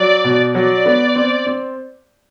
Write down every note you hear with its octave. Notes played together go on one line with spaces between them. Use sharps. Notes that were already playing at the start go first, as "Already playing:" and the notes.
Already playing: F#3 D5
B2
F#3 D5
B3
C4
C4